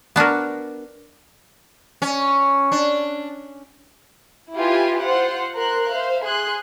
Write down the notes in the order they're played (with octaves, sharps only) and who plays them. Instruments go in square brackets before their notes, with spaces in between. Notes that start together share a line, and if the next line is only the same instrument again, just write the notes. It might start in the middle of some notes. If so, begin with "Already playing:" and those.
[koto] B3 D4 F#4 A#4
[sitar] C#4
D4
[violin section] E4 F4 G4 B4 G#5
F4 C5 F#5
A#4 C5 C6 F#6
C5 E5 F5
G#4 C6 F#6